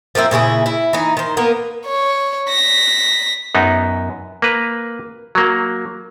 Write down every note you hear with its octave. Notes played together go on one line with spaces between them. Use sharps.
F3 A#3 C4 E4
A#2 C#3 E4 G#4
E4
E3 D#4
D#3 C5
A#3 B3 A#4
C#5
A#6 B6
F#2 B3 D#4
A#3 B4
F#3 A#3